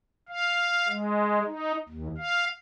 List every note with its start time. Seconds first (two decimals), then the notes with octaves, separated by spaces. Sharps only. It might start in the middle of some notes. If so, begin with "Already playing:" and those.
0.29 F5
0.88 G#3
1.46 D#4
1.89 D#2
2.18 F5